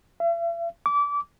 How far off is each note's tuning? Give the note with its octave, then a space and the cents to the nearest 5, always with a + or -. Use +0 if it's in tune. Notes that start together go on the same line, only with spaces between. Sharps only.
E5 +45
D6 -25